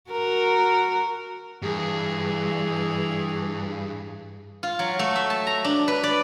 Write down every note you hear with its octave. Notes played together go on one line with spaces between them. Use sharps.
F#4 A#4
G2 E3 G#4
F4
F#3
A3
E5
A5
A#5
D4
B4
D5